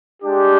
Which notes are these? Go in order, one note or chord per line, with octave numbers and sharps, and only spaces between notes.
G#3 D4 G4